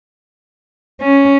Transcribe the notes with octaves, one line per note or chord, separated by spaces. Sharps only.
C#4